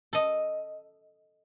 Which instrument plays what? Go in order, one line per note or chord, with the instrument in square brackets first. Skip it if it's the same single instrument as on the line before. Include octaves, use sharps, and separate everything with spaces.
[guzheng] A4 D#5